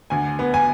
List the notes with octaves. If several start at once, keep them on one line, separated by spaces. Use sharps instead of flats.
D2 G#5
B3
G#5